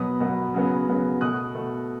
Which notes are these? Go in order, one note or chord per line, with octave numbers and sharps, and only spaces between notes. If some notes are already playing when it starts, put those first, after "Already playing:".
Already playing: B2 F#3 B3 D#6
B2 F#3 B3
C#3 F#3 B3
C#3 F#3 B3
B2 A3 D#6 F#6
B2 A3